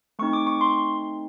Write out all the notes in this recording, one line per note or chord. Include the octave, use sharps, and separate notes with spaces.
A3 C4 D#4 C#6
D6
C#6
C6